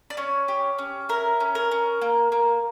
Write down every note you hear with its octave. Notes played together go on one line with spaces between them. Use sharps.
D5
C#4 C#5
G4
C#4
E4 A#4
C#4
A#4
C#4
A#3
A#3